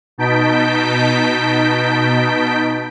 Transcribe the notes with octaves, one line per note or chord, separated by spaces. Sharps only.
B2 D#4 A5 G6 B6 D7